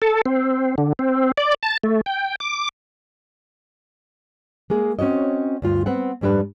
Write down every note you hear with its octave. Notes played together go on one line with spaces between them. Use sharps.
A4
C4
D3
C4
D5
A5
A3
G5
D6
G#3 A#3 G#4
C4 C#4 F#4 C#5 D#5
D2 G2 F4
B3 C4 F#5
F2 G#2 G3 D4 B4